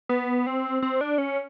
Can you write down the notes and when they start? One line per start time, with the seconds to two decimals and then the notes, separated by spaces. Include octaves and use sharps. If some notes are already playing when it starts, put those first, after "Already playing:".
0.09 B3
0.47 C4
0.82 C4
1.01 D4
1.18 C#4